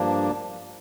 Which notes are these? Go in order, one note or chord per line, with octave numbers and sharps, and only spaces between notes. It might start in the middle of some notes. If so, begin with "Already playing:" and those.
Already playing: G2 F3 A#3 D4